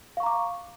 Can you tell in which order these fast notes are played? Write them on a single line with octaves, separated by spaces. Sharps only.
F5 C#6 A#5 D6